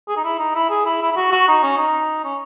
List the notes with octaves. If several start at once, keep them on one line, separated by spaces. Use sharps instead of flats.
G#4
D#4
E4
D#4
E4
G#4
E4
E4
E4
F#4
F#4
D#4
C#4
D#4
C#4